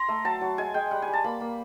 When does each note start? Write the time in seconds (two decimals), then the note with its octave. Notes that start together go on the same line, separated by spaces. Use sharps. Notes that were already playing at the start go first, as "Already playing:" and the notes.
Already playing: A#5 C6
0.08 A3
0.24 F#3 A5
0.41 F#3
0.58 G#3 G#5
0.74 G#3 G5
0.91 G3 F#5
1.02 G#5
1.08 G3
1.13 A5
1.24 A#3 B5
1.41 A#3